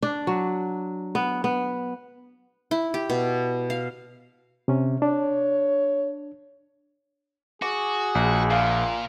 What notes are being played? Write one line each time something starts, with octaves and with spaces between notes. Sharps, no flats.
D4
F#3
B3
B3
E4
G4
B2
F5
C3 C#4
D4 C#5
F#4 G#4 D6
A#1
A#2 F5